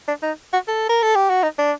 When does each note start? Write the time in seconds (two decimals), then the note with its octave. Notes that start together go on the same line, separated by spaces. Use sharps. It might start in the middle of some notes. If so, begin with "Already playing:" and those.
0.08 D4
0.23 D#4
0.53 F#4
0.68 A4
0.89 A#4
1.03 A4
1.16 G4
1.30 F#4
1.43 D#4
1.59 D4